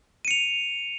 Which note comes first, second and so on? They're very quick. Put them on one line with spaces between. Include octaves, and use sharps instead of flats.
D#7 C#7 F7